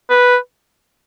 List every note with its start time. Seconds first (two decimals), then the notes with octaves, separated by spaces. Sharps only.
0.10 B4